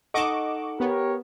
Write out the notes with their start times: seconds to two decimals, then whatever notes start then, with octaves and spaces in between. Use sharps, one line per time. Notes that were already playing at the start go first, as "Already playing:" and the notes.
0.14 D#4 A4 D#5 F#5 C#6 D6 E7
0.80 B3 G4 A#4 C#5